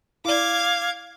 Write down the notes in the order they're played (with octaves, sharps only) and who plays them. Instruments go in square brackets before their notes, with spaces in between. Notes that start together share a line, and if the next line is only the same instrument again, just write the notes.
[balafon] E4 D5 [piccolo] F5 [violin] D6 G#6